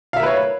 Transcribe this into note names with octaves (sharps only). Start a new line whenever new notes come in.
A#4 B4 C#5 E5 F5